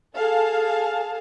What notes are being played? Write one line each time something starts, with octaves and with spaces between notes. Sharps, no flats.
G#4 A4 F5 A5